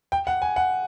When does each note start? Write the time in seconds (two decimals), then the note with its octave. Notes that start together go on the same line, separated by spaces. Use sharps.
0.12 G5
0.27 F#5
0.42 G#5
0.56 F#5